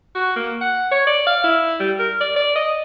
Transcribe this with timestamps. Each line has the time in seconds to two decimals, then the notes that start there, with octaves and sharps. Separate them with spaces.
0.15 F#4
0.36 A#3
0.61 F#5
0.92 C#5
1.07 D5
1.27 F5
1.44 E4
1.80 G3
1.99 A#4
2.21 D5
2.36 D5
2.56 D#5